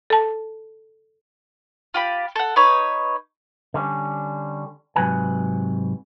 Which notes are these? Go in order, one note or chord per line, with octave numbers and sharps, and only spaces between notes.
A4 A5
F4 G4 B5
A4 F#5
D#4 B4 C#5
D3 G3 C#4
G#2 C3 F#3 F#4 B4 G#5